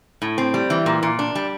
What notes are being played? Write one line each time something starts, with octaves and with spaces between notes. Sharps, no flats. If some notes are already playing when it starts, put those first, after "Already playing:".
A2
C4
G3
E3
A#2
A#2
D4
G3